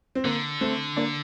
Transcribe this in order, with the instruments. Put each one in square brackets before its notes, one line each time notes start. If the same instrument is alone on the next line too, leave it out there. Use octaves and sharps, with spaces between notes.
[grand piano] C4
[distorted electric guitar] D3 [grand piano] A#3
[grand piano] A3 C4
A#3 D4